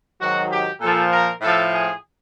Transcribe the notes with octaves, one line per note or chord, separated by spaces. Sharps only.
G#2 D#3 F#3 F#4
G4
A#2 F3 A4
A#4
A2 F3 A4
G#4